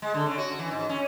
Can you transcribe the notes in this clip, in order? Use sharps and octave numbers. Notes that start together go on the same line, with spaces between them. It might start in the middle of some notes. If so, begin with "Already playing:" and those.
G#3
D3
C#3
F#4
E3
G#2
C#4